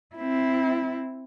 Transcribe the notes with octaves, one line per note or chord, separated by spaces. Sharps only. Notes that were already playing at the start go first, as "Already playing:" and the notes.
C4 E4